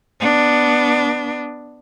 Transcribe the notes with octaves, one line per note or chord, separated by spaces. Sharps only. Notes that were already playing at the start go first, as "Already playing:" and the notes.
B3 D4